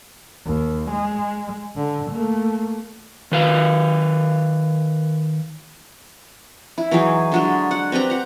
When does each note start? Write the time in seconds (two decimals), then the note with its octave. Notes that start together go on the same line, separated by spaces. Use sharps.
0.46 D#2
0.91 G#3
1.76 D3
2.11 A3 A#3
3.32 D#3 B4 F5
6.78 E4
6.91 E3 F#3 D#4 G#4
7.32 D3 F#3 G#3
7.71 F#5
7.92 C4 G4 B4 A#5
8.10 F#5 A#5